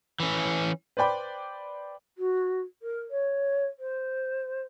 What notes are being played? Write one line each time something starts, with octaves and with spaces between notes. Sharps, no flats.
E3 C#4
B4 C5 D5 G5 B5
F#4
A#4
C#5
C5